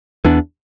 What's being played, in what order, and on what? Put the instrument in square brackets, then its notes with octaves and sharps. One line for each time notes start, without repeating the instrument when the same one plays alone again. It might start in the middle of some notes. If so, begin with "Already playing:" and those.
[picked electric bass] E2 E3 B3 D4